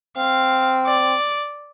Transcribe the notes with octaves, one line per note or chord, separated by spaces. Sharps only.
C4 F5
D5